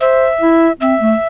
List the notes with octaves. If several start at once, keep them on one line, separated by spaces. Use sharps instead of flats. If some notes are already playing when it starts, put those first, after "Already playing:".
C5 E5
E4
C4 E5
A3